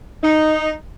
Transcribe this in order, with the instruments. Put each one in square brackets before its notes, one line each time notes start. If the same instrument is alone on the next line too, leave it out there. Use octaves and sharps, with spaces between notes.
[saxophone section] D#4